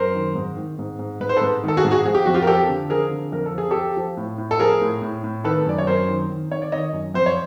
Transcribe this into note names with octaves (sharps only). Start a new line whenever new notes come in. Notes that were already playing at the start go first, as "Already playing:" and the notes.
Already playing: F#2 A#4 C5
D#3
G#2
D#3
G#2
G#2
G#2 B4
C5
A4 B4
G#2
D#3 A4
F#4 G#4
G#2
F#4 G#4
F3 G#4
G4
F2 F#4
F4 G4
A#4
F3 G4 A4
D3
F3 G#4 A#4
D3
F2 A#4
A4
F3 G#4
F3 G4 A4
F3
A2
A2
A4
F3 G#4 A#4
A2
A2
A2
D#3 A4 B4
F#2 D5
C#5
F#2 A#4 C5
D#3
D#3
D#3 C#5
D5
D#3 C#5 D#5
F#2
F2 C5
C#5